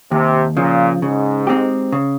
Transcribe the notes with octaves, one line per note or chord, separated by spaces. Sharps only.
D#2 C3
A#2 C#3 F3
G#2 C#3
G#3 C4 D#4 G4
C#3